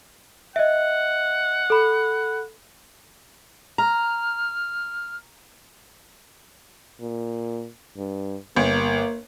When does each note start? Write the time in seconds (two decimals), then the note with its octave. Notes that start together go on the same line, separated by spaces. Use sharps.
0.56 D#5 E5 F#5
1.70 A4 B5
3.78 A#5 F6
7.01 A#2
7.98 G2
8.56 G1 A#3